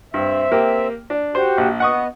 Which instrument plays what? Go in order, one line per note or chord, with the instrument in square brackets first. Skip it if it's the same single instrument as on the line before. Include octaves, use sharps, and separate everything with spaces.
[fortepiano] G2 [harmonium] C4 E5
[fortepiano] A#3 G4
D4
[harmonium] F#4 G4 [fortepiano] C5
[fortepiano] A#1
[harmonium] B3 D#5 [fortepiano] F#5 C#6 D#6